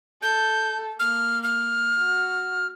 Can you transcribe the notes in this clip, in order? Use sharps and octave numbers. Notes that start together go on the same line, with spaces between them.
A4 G6
A#3 F6
F6
F#4